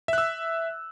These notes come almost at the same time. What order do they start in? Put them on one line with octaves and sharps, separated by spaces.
E5 F#6 E6